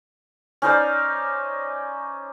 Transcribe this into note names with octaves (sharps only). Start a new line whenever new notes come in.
C#4 D#4 C5 D5